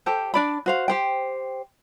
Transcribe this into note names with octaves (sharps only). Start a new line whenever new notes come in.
G4 A4 C5
D4 D5 B5
F#4 C5 F5
G4 C5 G5